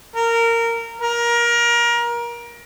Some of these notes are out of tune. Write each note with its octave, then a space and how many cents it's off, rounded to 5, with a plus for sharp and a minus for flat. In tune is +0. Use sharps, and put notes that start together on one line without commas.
A#4 -15
A#4 +25